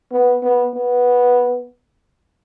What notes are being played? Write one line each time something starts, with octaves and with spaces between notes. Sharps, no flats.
B3
B3
B3